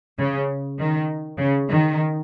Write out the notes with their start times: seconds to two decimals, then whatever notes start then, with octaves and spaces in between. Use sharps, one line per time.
0.18 C#3
0.78 D#3
1.37 C#3
1.68 D#3